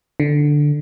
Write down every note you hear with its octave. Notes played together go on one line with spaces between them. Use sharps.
D3